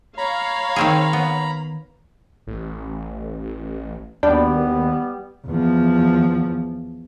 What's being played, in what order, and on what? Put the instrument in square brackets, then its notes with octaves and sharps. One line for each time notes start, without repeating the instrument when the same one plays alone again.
[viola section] C#5 F5 [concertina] A#5 B5
[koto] D#3 C4 G#4
B3
[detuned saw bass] A1
[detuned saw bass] D#2 [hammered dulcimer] G3 [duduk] B3 [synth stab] D4 D5 G5
[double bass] E2 F3